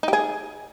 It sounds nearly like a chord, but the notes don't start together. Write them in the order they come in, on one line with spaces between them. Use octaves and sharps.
D#4 G4 G#4